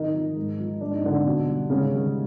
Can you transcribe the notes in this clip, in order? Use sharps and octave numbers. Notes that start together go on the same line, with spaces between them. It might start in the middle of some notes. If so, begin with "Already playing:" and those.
Already playing: D#3 D#4
F3
G#2
F3
G#2 D4
D#4
D3 F3 D4
B2
G3
G#2 C#3 C#4
D#3 G3